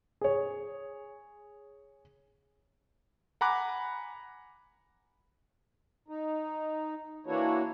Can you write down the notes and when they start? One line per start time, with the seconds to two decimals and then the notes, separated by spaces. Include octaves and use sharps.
0.21 G#4 C#5
3.41 F#5 G#5 A#5 B5 D6 F#6
6.08 D#4
7.26 E3 A#3 D4 E4 F#4 C#5